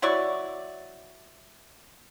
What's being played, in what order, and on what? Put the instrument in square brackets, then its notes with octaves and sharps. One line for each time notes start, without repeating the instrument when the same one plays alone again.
[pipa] F#3 E4 D5 C#6